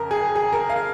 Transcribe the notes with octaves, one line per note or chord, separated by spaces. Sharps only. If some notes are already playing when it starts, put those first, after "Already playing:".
Already playing: F2 C#3 A#4
G#4
G#4
A#4
F5